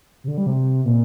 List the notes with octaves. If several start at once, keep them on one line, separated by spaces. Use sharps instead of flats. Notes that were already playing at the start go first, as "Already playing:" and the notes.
C3
D3
G3
C3
A#2